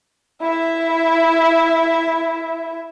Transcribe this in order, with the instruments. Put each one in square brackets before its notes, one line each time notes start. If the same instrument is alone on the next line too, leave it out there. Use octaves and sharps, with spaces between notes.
[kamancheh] E4 E5